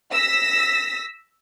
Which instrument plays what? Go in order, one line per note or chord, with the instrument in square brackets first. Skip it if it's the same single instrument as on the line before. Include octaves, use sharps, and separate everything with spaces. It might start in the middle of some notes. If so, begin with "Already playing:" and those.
[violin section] E6 A#6 B6